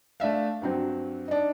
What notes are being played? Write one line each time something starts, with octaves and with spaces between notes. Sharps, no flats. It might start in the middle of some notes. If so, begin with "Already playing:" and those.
A3 D4 E5 F5
G2 F#3 C4
D4 D#4